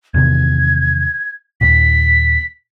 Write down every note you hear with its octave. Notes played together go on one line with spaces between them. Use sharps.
E2 C3 D#3 G#6
D#2 A#2 B6